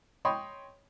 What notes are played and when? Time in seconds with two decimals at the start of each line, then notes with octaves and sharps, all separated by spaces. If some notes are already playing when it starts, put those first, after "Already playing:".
0.25 C#5 D#5 G5 B5 C6 D#6